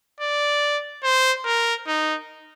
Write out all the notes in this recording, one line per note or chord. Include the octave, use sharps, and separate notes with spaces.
D5
C5
A#4
D#4